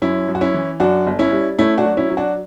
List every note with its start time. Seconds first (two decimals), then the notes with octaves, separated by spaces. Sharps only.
0.02 F#2 C#4 E4
0.28 F#2
0.35 F#4
0.41 C#4 E4
0.54 E3
0.80 F#2 D4 F#4
1.07 G1
1.19 C#4 E4
1.32 G3
1.58 A3 C#4 E4
1.78 D4 F#4
1.85 F#3
1.97 C#4 E4
2.10 F#3
2.17 D4 F#4